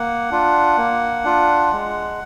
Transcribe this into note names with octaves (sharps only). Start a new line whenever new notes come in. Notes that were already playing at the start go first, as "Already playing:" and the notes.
Already playing: A#3 F#5
D4 F4
A#3
D4 F4
G#3